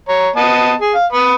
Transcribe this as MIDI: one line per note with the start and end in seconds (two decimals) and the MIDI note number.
0.09 0.30 73
0.09 0.30 82
0.36 0.74 59
0.36 0.74 75
0.36 0.74 81
0.81 0.94 68
0.94 1.06 77
1.12 1.35 71
1.12 1.35 83
1.12 1.35 87